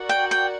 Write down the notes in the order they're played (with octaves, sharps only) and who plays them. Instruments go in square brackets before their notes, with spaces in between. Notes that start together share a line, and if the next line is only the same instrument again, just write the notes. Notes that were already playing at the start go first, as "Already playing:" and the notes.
Already playing: [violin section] F#4 A#4 D5 F#5
[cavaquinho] G5
G5